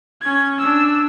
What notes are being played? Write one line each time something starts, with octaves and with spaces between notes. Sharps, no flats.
C#4 G#6
D4 E6